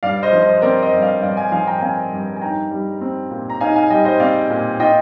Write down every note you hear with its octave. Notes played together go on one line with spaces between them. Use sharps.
G2 D5 F5
C5 D#5
F3
C5 D#5
C5
C4 A#4 D5
C5 D#5
G2
D5 F5
G2 D5 F5
F5 G#5
F3 F5 G#5
G5 A#5
C4 F5 G#5
G2
G#5
D#4 G5 A#5
G3
C4
A#2
A#5
D#4 F5 G#5
F5 G#5
G3 D#5 G5
C5 D#5
C4 D5 F5
A#2
F4 D#5 G5